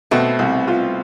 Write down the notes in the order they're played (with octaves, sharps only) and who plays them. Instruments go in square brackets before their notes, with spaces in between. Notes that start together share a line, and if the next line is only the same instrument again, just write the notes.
[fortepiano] B2 [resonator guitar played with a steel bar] A3 C4
[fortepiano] C2
F4